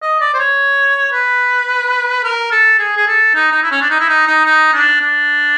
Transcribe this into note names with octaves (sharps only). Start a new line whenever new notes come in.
D#5
D5
C5
C#5
B4
A#4
A4
G#4
G#4
A4
D#4
D#4
E4
C#4
D4
D#4
E4
D#4
D#4
D#4
D4
D4